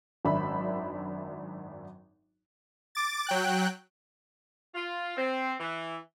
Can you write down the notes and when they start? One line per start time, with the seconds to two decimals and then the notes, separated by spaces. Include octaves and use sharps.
0.25 G#1 F#2 D4 E5 B5
2.95 D6 A6
3.26 F#3 G5 F#6
4.75 F4
5.17 C4
5.60 E3